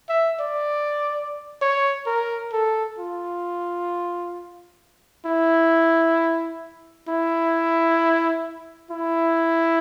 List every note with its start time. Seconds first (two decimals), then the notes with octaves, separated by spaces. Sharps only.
0.09 E5
0.40 D5
1.62 C#5
2.06 A#4
2.53 A4
2.98 F4
5.26 E4
7.09 E4
8.91 E4